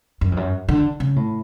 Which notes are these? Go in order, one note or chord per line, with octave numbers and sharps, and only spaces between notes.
F#2
F2
F#2
D3
C#3
A2